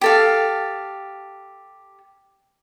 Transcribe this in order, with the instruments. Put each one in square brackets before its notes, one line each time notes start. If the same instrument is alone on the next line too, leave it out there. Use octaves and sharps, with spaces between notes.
[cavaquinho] G4 A4 F5